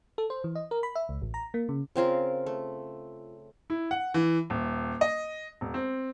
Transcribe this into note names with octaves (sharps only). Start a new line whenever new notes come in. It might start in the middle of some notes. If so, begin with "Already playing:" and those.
A4
C5
E3
D#5
A#4
B5
E5
C#2
A1
A#5
A#3
C#3
C#3 C4 F4 A#4
A3
E4
F#5
E3
D#1
D#5
E1
C4